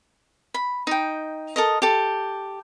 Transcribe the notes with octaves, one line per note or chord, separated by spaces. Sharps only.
B5
D#4 G5
A4 A#4 D#5
G4 A4